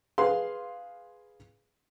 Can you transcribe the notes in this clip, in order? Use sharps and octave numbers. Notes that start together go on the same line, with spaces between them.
G#4 B4 F5 C6